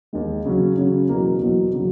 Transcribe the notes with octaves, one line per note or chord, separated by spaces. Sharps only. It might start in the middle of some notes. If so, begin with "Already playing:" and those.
D#2 D#3 G#3
C#3 F#3 C#4
C#3 F#3 C#4
E2 B2 F#3 A#3
E2 B2 F#3 A#3
C#3 F#3